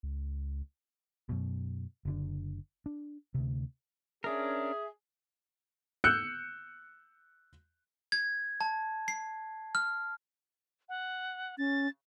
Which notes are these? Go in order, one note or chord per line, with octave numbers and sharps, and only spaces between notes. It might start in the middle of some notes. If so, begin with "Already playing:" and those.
C#2
F#2 B2
F#1 D3 D4
D4
D2 C3
C#4 D4 G#4 A#4 E5
E6 F#6 G6 C#7
G#6
A5
C7
F6
F#5
C#4 A6